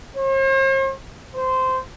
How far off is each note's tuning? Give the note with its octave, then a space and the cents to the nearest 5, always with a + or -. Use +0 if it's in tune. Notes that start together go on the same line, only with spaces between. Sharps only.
C5 +45
C5 -15